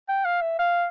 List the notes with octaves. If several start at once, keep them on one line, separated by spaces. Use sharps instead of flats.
G5
F5
E5
F5